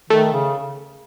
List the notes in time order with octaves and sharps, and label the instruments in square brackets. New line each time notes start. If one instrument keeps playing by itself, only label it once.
[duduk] D#3 [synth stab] A3
[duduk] C#3